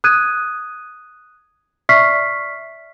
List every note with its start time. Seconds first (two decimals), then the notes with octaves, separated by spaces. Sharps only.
0.04 D#6 F#6 G#6 D#7
1.89 D5 E5 C#6 F6 B6 C7